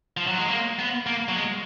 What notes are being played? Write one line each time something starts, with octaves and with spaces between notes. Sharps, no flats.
F3
F#3
G#3
A#3
B3
A#3
F#3
G#3